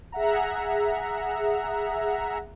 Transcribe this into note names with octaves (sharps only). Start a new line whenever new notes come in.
G#4 E5 F#5 A#5